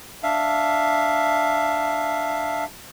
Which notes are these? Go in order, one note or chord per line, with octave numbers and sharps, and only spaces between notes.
D4 E5 F5